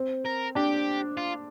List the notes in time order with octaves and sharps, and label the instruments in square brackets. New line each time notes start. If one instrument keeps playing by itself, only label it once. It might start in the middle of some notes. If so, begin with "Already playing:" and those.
Already playing: [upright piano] C4
[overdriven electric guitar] A#4
[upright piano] D4 [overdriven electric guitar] G4
[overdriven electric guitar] F4